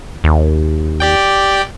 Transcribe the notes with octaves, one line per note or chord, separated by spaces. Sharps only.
D#2
G4 D5 G5